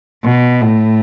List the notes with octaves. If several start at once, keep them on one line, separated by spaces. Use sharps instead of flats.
B2
A2